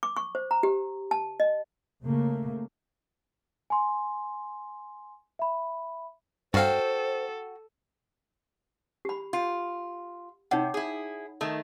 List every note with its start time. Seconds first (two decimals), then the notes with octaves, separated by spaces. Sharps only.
0.03 D6
0.16 C#6
0.35 C5
0.51 A#5
0.63 G4
1.11 A5
1.40 D#5
2.04 C#3 A3 A#3
3.70 G#5 C6
5.39 E5 B5
6.54 G2 F#4 A4 C5 F5 G5
9.05 G4 B5
9.33 F4
10.51 C3 D#4 C#5 F#5
10.74 E4 G#4
11.41 D#3 A3